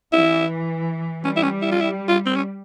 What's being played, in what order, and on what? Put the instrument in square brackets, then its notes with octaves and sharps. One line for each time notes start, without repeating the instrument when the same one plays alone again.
[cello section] E3 [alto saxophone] E4
[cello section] G3 [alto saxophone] C#4
[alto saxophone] E4
C#4
E4
F4
E4
F4
C4
C#4